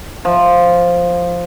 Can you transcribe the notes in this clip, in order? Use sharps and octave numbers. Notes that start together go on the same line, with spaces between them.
F3